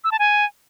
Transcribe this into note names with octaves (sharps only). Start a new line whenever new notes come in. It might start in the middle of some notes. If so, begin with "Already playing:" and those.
E6
A5
G#5